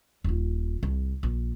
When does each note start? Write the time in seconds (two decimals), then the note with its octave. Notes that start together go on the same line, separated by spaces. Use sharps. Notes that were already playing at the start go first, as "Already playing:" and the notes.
0.24 D#1 F4
0.83 C2
1.23 A#1